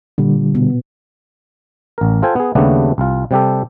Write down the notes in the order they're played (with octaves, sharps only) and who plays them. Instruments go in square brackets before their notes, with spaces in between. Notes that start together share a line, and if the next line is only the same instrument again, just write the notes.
[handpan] A#2 [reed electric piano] D3 G3
[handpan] B2 B3
[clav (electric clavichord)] A1 A#4
F4 A4 C5 G5 G#5
B3 G#4
D#2 C#3 G3 A3 B3 D4
C2 F4
C3 G3 G4 A4